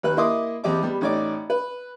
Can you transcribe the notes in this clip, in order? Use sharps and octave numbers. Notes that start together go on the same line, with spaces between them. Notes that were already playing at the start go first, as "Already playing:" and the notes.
D#2 B4 F#6
A#3 E4 D#5 C6 D6 D#6
E2 C4 G4 D#5 D6
G3 B3
A1 D#4 C#5 D5 D6
B4